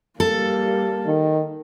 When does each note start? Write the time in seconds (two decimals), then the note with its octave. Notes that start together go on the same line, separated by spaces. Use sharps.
0.20 G3 A#3 A4
1.06 D#3